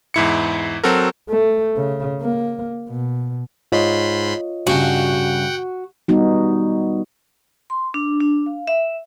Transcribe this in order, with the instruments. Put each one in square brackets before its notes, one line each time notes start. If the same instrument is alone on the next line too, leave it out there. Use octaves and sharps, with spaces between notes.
[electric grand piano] E2 G#2 E4 C#7
F#3 C4 F#4 A4 A#4
[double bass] A3
C#3
A#3
B2
[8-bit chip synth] G#2 B5 C6 [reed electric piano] F4 C#5 D#5
[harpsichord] G2 C#3 [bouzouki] F#4 [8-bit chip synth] F#5 G5
[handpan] G3 B3 D#4 F#4
[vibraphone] C6
D4
D4
F5
E5